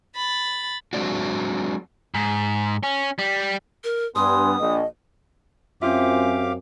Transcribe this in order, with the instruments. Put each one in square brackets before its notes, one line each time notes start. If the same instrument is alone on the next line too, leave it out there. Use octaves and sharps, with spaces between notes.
[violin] B5 A6
[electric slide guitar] F#3 G#3 A#3 C4 D4 F#4
[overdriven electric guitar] G#2
C#4
G3
[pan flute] A#4
[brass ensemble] G2 B3 G#5 [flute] C6 [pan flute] D#6
[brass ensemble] A#1 [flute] D#5
[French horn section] F#2 C4 [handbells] C#4 E5 [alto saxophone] F4 [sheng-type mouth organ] G4 F5 D6